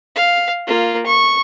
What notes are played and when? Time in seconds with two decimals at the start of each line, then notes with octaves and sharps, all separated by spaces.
0.16 F5
0.67 A#3 F4
1.06 C#6